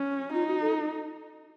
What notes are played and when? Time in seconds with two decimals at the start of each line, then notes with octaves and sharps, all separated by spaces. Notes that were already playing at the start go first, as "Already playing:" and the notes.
Already playing: C#4
0.33 D#4 F4
0.47 F#4
0.61 A4